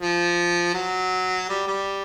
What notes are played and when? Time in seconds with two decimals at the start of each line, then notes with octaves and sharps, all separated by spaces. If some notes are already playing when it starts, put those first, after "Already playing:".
0.01 F3
0.74 F#3
1.49 G3
1.67 G3